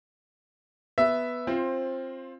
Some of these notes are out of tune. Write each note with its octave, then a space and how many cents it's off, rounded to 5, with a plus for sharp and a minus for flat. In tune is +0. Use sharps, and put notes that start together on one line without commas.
B3 +0 E5 +0
C4 +20 F4 -5 C5 +15